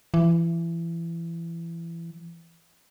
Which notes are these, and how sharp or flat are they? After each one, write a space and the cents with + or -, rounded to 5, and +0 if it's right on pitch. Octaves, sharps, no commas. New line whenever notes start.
E3 +25